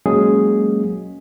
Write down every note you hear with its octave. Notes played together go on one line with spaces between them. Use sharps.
F#3 G#3 A#3 C#4 G#4